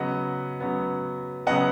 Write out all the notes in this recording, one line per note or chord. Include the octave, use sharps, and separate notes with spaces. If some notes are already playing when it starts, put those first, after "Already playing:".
Already playing: C#3 F#3 B3 D#5 F#5
C#3 F#3 B3
C#3 F#3 B3 D#5 F#5